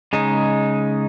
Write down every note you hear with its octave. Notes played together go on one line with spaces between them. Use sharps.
C#3 G#3 D#4